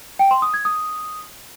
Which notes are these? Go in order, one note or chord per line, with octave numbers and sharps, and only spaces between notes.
G5
C6
D#6
G#6
D#6